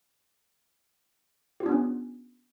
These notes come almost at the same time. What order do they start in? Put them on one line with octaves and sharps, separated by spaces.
G4 F4 D4 B3 C#4